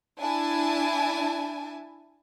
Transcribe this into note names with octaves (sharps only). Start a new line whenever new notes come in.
D4 E4 G#5 A5